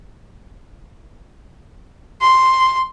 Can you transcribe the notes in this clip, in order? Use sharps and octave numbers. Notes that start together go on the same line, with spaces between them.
C6